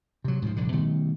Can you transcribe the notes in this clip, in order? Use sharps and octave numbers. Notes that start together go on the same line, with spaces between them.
C3 F#3
G#2 B2 D3 F3
F1 A#1 G2 D3
B2 D#3 G3 A3